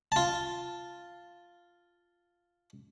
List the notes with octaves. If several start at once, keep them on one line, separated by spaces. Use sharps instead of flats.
F4 A5